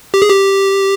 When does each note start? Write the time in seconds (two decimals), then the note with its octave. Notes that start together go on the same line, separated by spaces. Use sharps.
0.14 G4
0.22 G#4
0.29 G4